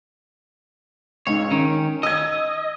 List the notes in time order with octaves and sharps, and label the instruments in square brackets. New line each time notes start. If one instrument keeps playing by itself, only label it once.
[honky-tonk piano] C#2 G#2 [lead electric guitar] C#5
[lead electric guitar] D#3 [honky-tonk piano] C#4
[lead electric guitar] D#5 [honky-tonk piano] E6 G#6